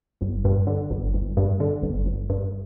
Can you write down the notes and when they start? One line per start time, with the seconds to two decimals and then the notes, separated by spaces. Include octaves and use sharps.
0.21 G1
0.44 G2
0.67 D3
0.91 G1
1.14 G1
1.37 G2
1.60 D3
1.83 G1
2.06 G1
2.30 G2